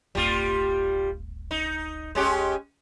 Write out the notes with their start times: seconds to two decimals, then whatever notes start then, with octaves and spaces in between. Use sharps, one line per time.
0.15 D1 G1 G3 F4
1.51 D#4
2.15 G#3 C#4 G4